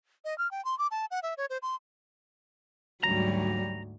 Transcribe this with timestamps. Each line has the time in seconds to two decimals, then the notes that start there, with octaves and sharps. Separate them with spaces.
0.25 D#5
0.38 F6
0.51 G5
0.65 C6
0.79 D6
0.91 A5
1.11 F#5
1.23 E5
1.38 C#5
1.50 C5
1.62 C6
3.04 D2 G#2 F#3 G3 A#5